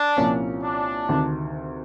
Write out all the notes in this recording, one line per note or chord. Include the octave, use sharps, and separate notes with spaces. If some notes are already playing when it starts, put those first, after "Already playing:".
Already playing: D4
C2 A#2 F3 A#3 C#4
D4
D2 C3 D#3